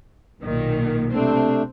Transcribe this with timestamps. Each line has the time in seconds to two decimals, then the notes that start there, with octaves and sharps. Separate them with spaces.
0.41 B1 A#2 D#3
1.14 C3 A3 C4 D4